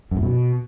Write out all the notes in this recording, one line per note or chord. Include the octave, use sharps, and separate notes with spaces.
F#2
A2
B2